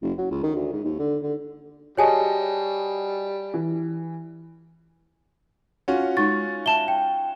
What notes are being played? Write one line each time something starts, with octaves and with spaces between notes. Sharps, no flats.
F#1
F#3
C#2
D#3
D2
G#2
D#2
D3
D3
G3 F#4 G#4 C#5 D#5 G#5 A5
E3
C#4 F4 F#4
G#3 D#4 C#6 A6
E5 A5 E7 G7
G5